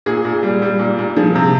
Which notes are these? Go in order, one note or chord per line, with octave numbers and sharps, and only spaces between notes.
A#2 G#4
A#2
G3
G3
A#2
A#2
F3 G#4
C3